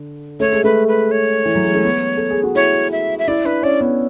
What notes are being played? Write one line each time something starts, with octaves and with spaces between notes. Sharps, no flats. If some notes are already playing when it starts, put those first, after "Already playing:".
Already playing: D3
A3 C#5
G#3
A3 B4
B4
C#5
E3
F#3
G#3
A3
B3
A4
G#4
F#4
E4 C#5
E5
E5
E4 D5
D4 B4
C#4 D5
B3